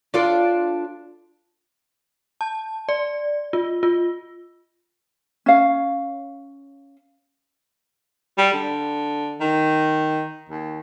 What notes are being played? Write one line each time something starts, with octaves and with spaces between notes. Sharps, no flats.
D4 F4 A4
A5
D5
F4
F4
C#4 F5
G3
D3
D#3
D#2